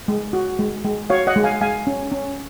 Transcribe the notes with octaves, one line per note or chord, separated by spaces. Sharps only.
G#3
F#4
G#3
G#3
F#4 C#5 F5
D#5 F#5
G#3
F5 G#5
G#3 F5 G#5
C#4
C#4